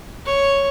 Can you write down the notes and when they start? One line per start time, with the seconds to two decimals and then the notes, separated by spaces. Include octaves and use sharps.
0.26 C#5